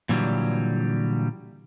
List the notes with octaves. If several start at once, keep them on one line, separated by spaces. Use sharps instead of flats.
A#2 D3 E3 F#3 G3